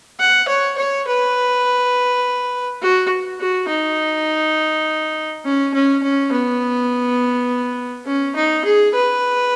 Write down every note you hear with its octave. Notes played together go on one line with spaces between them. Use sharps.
F#5
C#5
C#5
B4
F#4
F#4
D#4
C#4
C#4
C#4
B3
C#4
D#4
G#4
B4